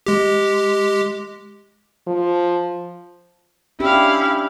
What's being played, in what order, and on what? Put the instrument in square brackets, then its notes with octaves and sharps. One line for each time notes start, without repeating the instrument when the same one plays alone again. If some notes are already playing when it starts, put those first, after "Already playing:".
[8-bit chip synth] G#3 G4
[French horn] F3
[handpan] C#4 D4 G4 [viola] E4 F5